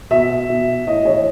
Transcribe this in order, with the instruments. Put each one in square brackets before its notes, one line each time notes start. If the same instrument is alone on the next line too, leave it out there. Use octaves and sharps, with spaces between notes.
[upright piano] B2 E5
B2
A2 D#5
E3 C#5